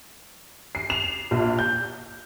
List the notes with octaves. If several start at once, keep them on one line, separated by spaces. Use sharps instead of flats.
C7
F7
A#1
G6